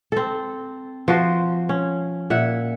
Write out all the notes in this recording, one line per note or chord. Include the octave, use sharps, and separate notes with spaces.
C4 A4
F3 F#4 C5
C#4
A#2 E5 F#5